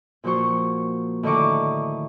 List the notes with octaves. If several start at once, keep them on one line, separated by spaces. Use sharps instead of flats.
A#2 F3 F#4 C5 C#6
A2 D3 D#3 D#5 C#6 D6